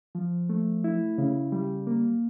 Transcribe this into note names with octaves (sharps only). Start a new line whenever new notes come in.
F3
A3
E4
C#3
G3
A#3